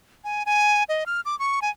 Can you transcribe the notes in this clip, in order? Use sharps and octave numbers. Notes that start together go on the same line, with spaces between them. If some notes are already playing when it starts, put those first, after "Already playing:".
G#5
G#5
D#5
F6
D6
C#6
G#5